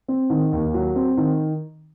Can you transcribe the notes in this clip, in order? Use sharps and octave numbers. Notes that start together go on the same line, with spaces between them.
C4
D#3
D#2
F#3
C4
D#3